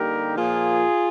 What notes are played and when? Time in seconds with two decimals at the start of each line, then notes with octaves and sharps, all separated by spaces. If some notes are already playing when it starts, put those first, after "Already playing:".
Already playing: D3 G3 A#3 D#4 G4 A#4
0.36 A#2 F3 A#3 F4 G#4